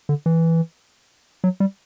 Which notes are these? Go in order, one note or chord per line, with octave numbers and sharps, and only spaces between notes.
D3
E3
F#3
G3